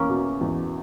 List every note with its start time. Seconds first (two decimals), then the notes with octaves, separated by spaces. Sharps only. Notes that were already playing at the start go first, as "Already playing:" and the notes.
Already playing: E2 A#3 C#4
0.09 B2
0.41 E2